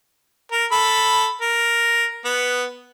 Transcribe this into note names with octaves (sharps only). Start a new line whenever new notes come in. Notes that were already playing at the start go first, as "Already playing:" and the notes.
A#4
A4 B5
A#4
B3